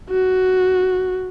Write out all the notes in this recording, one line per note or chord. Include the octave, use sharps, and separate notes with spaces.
F#4